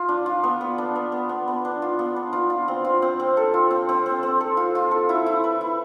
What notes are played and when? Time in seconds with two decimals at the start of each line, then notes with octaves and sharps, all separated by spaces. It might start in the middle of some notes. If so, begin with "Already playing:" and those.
Already playing: F4
0.09 D4
0.26 F4
0.43 B3
0.61 B3
0.78 D4
0.96 B3
1.12 B3
1.29 B3
1.48 B3
1.65 D4
1.82 F4
1.99 B3
2.16 D4
2.33 F4
2.50 F4
2.68 C4
2.84 F4
3.02 C4
3.20 C4
3.37 A4
3.54 F4
3.71 C4
3.89 C4
4.06 C4
4.23 C4
4.40 A4
4.57 F4
4.75 F4
4.91 A4
5.09 E4
5.26 E4
5.44 B4
5.61 E4